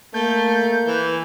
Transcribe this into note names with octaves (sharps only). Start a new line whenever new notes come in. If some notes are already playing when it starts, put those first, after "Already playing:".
A3 A#3 G6
E3